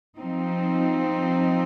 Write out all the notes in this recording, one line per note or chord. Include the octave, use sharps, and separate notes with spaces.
F3 C4 D#4